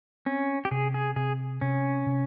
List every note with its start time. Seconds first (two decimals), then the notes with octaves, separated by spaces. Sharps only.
0.26 C4 C#4
0.65 G4
0.71 C3 G#4
0.94 G#4
1.16 C3 G#4
1.61 C3 C#4
2.07 C3